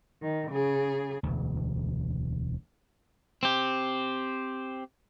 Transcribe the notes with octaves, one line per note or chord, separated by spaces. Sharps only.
D#3
C#3 G#4
E1 D2
C4 G4